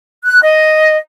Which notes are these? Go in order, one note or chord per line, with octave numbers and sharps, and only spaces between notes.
F#6
D#5